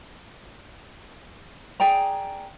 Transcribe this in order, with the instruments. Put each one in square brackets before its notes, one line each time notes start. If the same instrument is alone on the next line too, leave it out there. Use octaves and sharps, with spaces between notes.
[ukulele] G#4 D5 G5 A#5